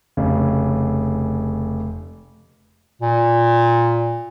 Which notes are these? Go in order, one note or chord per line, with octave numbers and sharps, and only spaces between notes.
F1 C#3
A#2